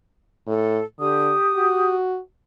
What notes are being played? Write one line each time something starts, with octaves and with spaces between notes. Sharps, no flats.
A2 A4
D3 G4 D#6
F#4